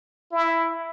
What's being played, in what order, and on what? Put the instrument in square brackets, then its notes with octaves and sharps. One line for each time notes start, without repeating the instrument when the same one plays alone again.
[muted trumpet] E4